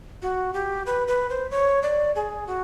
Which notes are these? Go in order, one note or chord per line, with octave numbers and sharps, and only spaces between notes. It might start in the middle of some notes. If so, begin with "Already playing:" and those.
F#4
G4
B4
B4
C5
C#5
D5
G#4
F#4